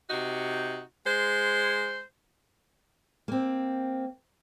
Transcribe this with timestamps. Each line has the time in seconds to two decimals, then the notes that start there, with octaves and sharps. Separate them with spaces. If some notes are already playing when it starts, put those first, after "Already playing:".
0.09 C3 D#4 F#4
1.06 G#3 C5
3.28 A#3 C4